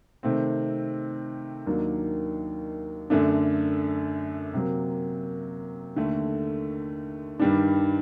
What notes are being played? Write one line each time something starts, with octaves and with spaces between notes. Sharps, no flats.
C3 D#3 A3 C4
D#2 D#3 F#3 A#3 D4
F#2 D3 A3 D4
C3 F#3 A#3
D#2 D3 A3
G2 D#3 G3 D4